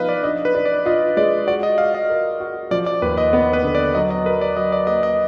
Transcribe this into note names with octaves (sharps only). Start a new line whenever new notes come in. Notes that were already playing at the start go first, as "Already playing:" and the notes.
Already playing: F3 B3 D#4 B4 D#5 F5
D5
D4 D#5
B4
D4
D5
F4 D#5
G#3 D5
F#4 D5
D#5
F#4 F5
D#5
A#4
F#4
F3 D5
D5
D#2 B4
D#5
B3
B4
D3
D5
F#3 D#5
D#5
A#4 B4
D5
F#3 D#5
D5
A#3 D#5
D#5